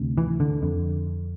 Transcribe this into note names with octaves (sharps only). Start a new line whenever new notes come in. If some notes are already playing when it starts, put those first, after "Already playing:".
Already playing: D2 C3
E3
D3
F2 D3